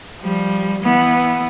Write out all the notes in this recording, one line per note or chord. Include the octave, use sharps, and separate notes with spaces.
F3 G3
E3 B3